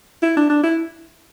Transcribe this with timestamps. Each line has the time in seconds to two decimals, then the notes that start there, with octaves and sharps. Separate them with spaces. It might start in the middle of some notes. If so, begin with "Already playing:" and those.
0.23 E4
0.37 D4
0.50 D4
0.63 E4